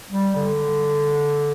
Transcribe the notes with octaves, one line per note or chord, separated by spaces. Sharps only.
G3
D3